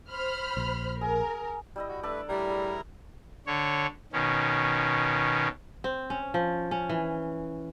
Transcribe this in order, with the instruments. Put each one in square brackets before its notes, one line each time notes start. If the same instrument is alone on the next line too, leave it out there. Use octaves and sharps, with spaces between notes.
[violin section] C5 B5 F6
[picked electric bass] A#1
[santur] G#4 [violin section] A#4
[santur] G3 E4 D#5
[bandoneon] F#4
[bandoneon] A3 B4 [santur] D4 A4 D5
[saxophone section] A2 G3 [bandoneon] E4 A#4 A#5
[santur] G#4
[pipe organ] D3 C#5
B2 D#3 C#4
[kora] C4
C#4
F3
C#4
E3